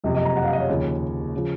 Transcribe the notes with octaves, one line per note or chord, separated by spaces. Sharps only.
F#1 F2 C3 D#5
D#5
A#5
F#5
F5
D#5
C#5
D#2 C#3 F3
C#3 F3